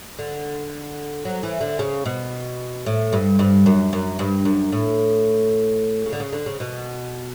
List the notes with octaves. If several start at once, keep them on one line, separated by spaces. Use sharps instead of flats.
D3
F#3
E3
D3
C#3
B2
A2
G2
G2
F#2
F#2
G2
F#2
A2
C#3
D3
C#3
D3
C#3
B2